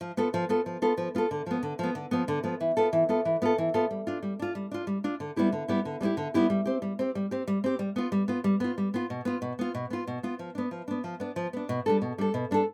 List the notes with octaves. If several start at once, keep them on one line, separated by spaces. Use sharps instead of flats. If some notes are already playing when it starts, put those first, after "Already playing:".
F3
B3 F4 A4
F3
B3 F4 A4
F3
B3 F4 A4
F3
B3 F4 A4
D3
F3 B3
D3
F3 B3
D3
F3 B3
D3
F3 B3
E3
B3 F4 A4
E3
B3 F4 A4
E3
B3 F4 A4
E3
B3 F4 A4
G3
D4 F4
G3
D4 F4
G3
D4 F4
G3
D4 F4
D3
G3 B3 E4 G4
D3
G3 B3 E4 G4
D3
G3 B3 E4 G4
D3
G3 B3 E4 G4
G3
C4 G4
G3
C4 G4
G3
C4 G4
G3
C4 G4
G3
B3 F4
G3
B3 F4
G3
B3 F4
G3
B3 F4
B2
B3 F4
B2
B3 F4
B2
B3 F4
B2
B3 F4
F3
B3 D4
F3
B3 D4
F3
B3 D4
F3
B3 D4
B2
G3 D4 A4
B2
G3 D4 A4
B2
G3 D4 A4